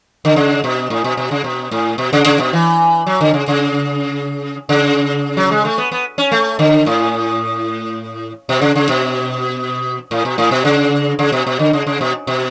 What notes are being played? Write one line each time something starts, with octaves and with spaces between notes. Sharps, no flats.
D3
C#3
B2
A2
B2
B2
C#3
B2
A2
B2
C#3
C#3
B2
E3
F#3
D3
C#3
C#3
C#3
F#3
G#3
A3
B3
B3
C#4
A3
D3
A2
B2
C#3
C#3
B2
A2
B2
A2
B2
C#3
C#3
B2
B2
D3
C#3
C#3
B2
B2